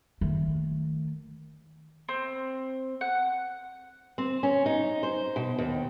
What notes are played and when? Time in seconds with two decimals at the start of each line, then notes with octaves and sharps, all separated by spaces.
0.21 D#3 A3
2.09 C4
3.01 F#5
4.18 C4
4.43 C#4
4.66 D#4
5.03 C5
5.36 B2
5.58 D#2